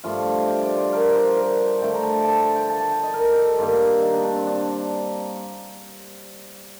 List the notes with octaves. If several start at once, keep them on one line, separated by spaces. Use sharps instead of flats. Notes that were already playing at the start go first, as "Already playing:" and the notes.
G2 F3 A3 F4
G4
D5
C5
A#4
D5
C5
A#4
D3 A3 G5
A#5
A5
G5
A5
A5
G5
A5
A5
G5
D#5
A#4
G4 A4
G2 D#3 A#3
D#4
D4
D4
C4
D4